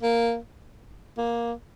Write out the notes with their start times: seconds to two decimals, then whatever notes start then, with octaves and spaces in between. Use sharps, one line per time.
0.02 A#3
1.18 A#3